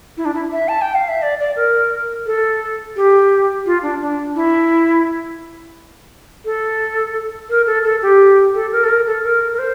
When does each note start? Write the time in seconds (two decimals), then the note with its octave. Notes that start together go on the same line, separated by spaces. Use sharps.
0.17 E4
0.25 D4
0.35 E4
0.52 E5
0.68 A5
0.82 G5
0.95 F5
1.09 E5
1.22 D5
1.39 D5
1.56 A#4
2.26 A4
2.96 G4
3.66 F4
3.83 D4
4.01 D4
4.35 E4
6.45 A4
7.50 A#4
7.66 A4
7.84 A4
8.02 G4
8.54 A4
8.72 A#4
8.84 A4
8.89 A#4
9.07 A4
9.24 A#4
9.53 A#4
9.59 C5